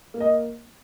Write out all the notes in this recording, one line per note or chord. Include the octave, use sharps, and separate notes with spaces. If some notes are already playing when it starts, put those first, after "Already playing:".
A#3
D#5